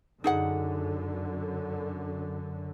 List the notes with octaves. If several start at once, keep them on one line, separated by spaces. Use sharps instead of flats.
F#2 D3 D#4 G#4 F#5